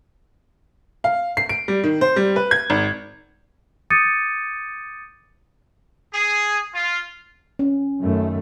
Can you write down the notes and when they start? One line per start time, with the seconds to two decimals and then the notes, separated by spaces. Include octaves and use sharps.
1.04 F5
1.37 C7
1.49 D7
1.68 G3
1.84 D#3
2.01 C5
2.16 G3
2.36 B4
2.51 G#6
2.70 G#1
3.90 D6 D#6 G6 A6 C#7 D#7
6.12 G#4
6.74 F4
7.59 C#4
8.00 F#2 D#3 A3